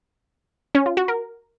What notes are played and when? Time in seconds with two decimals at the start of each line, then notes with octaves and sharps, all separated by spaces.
0.75 C#4
0.86 F4
0.97 F#4
1.08 A#4